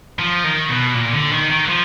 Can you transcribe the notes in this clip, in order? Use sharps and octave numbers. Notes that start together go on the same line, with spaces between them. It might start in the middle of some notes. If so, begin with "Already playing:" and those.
F3
D#3
B2
A#2
D3
D#3
D#3
F#3
F3